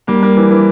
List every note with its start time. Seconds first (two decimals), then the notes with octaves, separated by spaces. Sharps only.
0.08 G3 A#3
0.23 A#3
0.37 E3
0.51 E3